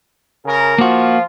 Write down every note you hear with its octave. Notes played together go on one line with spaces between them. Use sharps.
C#3 A#4
F3 A#3 F4 F#4